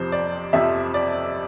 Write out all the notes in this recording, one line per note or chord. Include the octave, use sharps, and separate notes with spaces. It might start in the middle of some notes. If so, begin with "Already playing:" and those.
Already playing: F2 C3 F3 C5
D5
F2 C3 F3 E5
D5